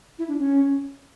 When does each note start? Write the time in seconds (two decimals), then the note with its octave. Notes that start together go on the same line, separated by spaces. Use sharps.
0.19 E4
0.28 D4
0.39 C#4